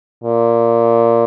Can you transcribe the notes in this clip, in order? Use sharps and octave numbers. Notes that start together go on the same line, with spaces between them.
A#2